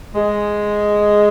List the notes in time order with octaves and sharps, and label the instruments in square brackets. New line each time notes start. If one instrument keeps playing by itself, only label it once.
[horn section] G#3